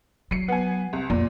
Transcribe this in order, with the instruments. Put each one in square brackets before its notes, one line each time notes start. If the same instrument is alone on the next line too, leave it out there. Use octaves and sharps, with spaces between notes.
[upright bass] F#3 [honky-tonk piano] C7 C#7
[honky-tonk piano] B3 G#5
C2
[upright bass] F2 [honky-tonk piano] A#2